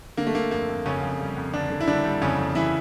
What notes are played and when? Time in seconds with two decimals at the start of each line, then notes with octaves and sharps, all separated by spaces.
0.17 D3 A#3
0.27 A3
0.35 D3 A#3
0.51 F2 A#3
0.69 F2
0.86 F2 C#3 C#4
1.02 F2
1.20 G3
1.36 F2
1.54 D3 D4
1.70 D3
1.81 E4
1.87 D3 G3 D4
2.05 G3
2.21 F2 C#3 C#4
2.38 F2
2.55 F2 E3 E4